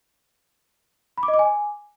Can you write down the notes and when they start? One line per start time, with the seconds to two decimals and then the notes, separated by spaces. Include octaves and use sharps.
1.18 B5
1.23 D6
1.28 D#5
1.34 D6
1.39 G#5